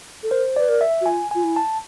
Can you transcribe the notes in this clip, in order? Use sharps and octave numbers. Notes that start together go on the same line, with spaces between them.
A4
A#4 C5
B4 D5
A#4
E5
F#4
F4 G#5
F4 G#5
E4
A5